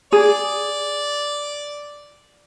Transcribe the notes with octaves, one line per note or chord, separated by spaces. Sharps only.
G#4 D5